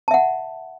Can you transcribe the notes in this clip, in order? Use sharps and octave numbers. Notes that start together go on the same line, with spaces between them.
E5 F#5 A5